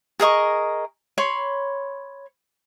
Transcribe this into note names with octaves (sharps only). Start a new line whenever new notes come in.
G#4 A#4 D#5 C#6
C#5 B5 C6